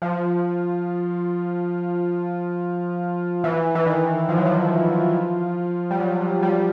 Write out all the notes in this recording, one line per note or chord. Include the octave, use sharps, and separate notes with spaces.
F3
E3
E3
D#3
F3
F#3
F3
G3
F#3
F#3
G3